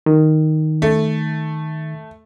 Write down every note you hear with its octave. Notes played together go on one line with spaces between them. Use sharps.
D#3
A3